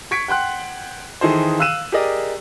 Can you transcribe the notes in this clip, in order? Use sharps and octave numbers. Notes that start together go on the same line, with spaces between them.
C#6 G#6 B6 C#7 D7
F#5 G5 C6 F#6
D#3 E3 D#4 G#4 A4 C5
F5 E6 F#6 D#7 E7
G4 G#4 A#4 D5 D#5